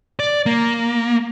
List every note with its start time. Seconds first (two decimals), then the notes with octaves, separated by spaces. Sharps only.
0.20 D5
0.46 A#3